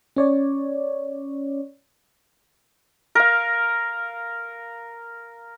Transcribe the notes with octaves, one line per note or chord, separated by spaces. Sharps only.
C#4 C#5 D5
A#4 F5